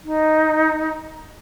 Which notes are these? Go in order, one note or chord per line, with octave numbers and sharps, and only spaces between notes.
D#4